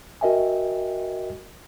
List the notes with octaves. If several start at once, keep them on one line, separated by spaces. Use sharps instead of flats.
F#4 A#4 D#5 E5 G5 G#5